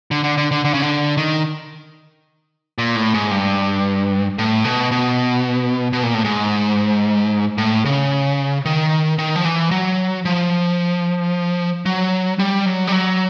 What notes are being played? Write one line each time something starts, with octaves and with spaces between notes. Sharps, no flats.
D3
D3
D3
D3
D3
C#3
D3
D#3
A#2
A2
G#2
G2
A2
B2
B2
B2
A#2
A2
G#2
A2
C#3
D#3
D#3
F3
E3
F#3
F3
F#3
G3
F#3
G3
F#3